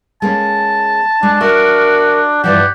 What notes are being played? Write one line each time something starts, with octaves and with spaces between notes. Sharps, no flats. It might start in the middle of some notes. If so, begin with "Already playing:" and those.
G#3 A#3 C#4 A5
G#3 D4
F#4 A#4 E5
G2 E3 F3 G4 D5 F#5